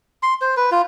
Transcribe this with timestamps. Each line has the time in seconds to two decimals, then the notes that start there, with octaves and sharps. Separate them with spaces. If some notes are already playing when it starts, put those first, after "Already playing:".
0.23 C6
0.41 C5
0.57 B4
0.72 F4